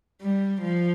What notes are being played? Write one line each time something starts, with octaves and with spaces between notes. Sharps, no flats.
G3
F3